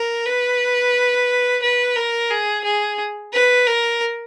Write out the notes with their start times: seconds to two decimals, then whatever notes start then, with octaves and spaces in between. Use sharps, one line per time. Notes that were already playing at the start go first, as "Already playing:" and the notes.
Already playing: A#4
0.25 B4
1.62 B4
1.96 A#4
2.31 G#4
2.64 G#4
3.33 B4
3.67 A#4